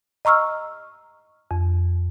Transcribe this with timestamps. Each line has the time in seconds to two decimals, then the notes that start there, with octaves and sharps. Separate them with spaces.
0.25 D#5 A#5 C#6 E6 F6
1.51 F2